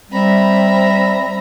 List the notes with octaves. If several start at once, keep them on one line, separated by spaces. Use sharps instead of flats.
G3 C4 E5 A#5 B5